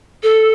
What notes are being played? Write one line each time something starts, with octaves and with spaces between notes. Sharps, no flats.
A4